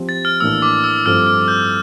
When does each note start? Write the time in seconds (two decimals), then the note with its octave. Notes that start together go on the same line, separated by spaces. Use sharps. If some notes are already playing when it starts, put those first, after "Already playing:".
Already playing: F3 C4 G4 C5
0.09 A6
0.25 F6
0.40 A2 E3 A#3 D4 E6
0.62 D6
0.84 E6
1.06 G2 F3 A3 C4 F4 F6
1.27 F6
1.48 G6